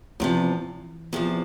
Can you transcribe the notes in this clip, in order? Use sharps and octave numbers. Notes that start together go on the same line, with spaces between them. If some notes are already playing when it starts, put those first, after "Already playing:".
E2 C3 E3 F3
E2 C3 F3